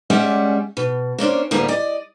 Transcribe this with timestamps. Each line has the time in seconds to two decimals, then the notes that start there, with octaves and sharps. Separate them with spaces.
0.10 G3 G#3 C#4 D5 E5 F#5
0.77 B2
1.18 A#3 C#4 D4 C5
1.51 D2 A2 G3 A#3 B3
1.68 D5 D#5